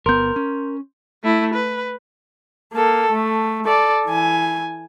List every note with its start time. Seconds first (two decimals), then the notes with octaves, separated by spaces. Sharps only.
0.06 G1 B3 A#4 C6 G6
0.36 C#4
1.24 A3 E4
1.54 B4
2.73 A#3 A4
3.12 A3
3.65 A4 D5
4.06 E3 G#5